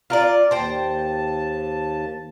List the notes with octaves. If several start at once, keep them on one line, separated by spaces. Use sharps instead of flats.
F4 A#4 D5
D#2 C5 G5 A5